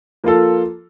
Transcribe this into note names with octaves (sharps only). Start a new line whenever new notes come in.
F3 A#3 F4 A4